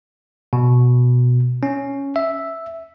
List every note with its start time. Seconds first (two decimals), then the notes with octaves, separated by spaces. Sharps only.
0.53 B2
1.63 C#4
2.16 E5